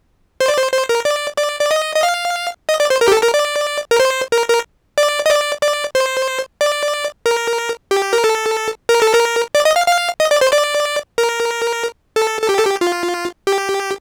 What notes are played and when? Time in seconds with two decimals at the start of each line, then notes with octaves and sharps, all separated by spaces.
0.40 C5
0.48 D5
0.58 C5
0.73 C5
0.89 A#4
1.05 D5
1.38 D5
1.60 D5
1.71 D#5
1.96 D#5
2.03 F5
2.69 D#5
2.80 D5
2.90 C5
3.01 A#4
3.08 G4
3.12 A4
3.23 A#4
3.34 D5
3.91 A#4
4.00 C5
4.32 A#4
4.48 A#4
4.98 D5
5.26 D#5
5.30 D5
5.62 D5
5.95 C5
6.61 D5
7.26 A#4
7.91 G4
8.13 A#4
8.24 A4
8.89 A#4
9.02 A4
9.14 A#4
9.55 D5
9.65 D#5
9.76 F5
9.87 F5
10.20 D#5
10.31 D5
10.41 C5
10.53 D5
11.18 A#4
12.16 A4
12.42 A4
12.49 G4
12.59 A4
12.65 G4
12.81 F4
13.47 G4